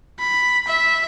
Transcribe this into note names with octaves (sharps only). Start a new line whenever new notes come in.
B5
E5